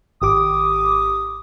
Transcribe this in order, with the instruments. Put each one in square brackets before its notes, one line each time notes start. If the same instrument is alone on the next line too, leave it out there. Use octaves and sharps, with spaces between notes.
[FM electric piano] G#1 G4 D6 [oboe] D#6